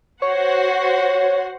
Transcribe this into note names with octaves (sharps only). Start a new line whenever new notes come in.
F#4 C5 C#5 F#5